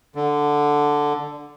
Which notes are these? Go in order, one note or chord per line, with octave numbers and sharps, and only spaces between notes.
D3